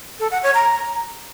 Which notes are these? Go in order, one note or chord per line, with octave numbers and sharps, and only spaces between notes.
A4
F#5
C#5
A#5